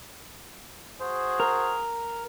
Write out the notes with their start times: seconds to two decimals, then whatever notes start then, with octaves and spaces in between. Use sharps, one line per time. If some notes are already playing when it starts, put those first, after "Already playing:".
1.01 F#4 G#4 C5
1.40 A#4